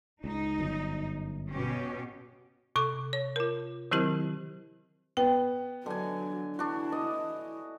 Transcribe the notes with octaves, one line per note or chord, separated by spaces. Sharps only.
C#2 D#4
G1 F#2
B2 C#4 G4
C3 A4 C#6 D6
C#5
F4 A#4
D#3 F#3 C4 E4 G4 A#4
B3 G5
D3 F#3 G#5
D4 E4 F#4
D#5